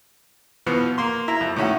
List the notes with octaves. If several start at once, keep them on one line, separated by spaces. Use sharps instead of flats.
B2 E3 F3 B3
A#3 C6
E4 A#5
F2
A2 D#3 C#4 E5 F#5